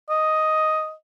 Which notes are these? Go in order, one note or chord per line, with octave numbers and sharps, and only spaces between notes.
D#5